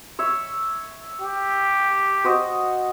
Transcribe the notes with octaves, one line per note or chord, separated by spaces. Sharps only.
C#5 E5
G4
F#4 C5 D#5